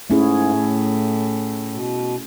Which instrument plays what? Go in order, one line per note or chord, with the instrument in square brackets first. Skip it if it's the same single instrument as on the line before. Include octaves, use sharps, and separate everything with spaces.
[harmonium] G#2 [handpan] A3 C#4 E4 G#4
[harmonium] A2
B2